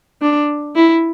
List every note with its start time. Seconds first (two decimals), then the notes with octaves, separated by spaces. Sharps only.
0.22 D4
0.75 E4